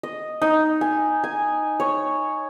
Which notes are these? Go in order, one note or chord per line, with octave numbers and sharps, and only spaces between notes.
D#5
D#4
G#5
G#5
C#5